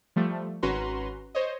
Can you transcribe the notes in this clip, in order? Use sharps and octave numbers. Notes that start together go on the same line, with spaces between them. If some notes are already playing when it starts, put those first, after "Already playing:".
F3 G3 A3
G#1 C#4 F#4 B4 A#5 C6
C5 C#5 D#5